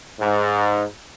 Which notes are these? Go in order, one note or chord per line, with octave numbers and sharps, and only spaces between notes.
G#2